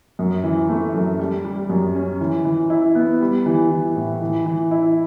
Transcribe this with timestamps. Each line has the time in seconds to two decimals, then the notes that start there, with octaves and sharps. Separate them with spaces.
0.19 F#2
0.44 E3
0.69 A3
0.94 F#2
1.19 G3
1.45 G3
1.69 F#2
1.95 C#4
2.20 E3
2.45 E3
2.70 E4
2.95 B3
3.20 G3
3.46 E3
3.71 E3
3.96 A2
4.21 E3
4.46 E3
4.71 E4